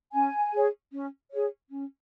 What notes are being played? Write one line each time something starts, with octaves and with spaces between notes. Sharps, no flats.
C#4 G#5
G#4 C#5
C#4
G#4 C#5
C#4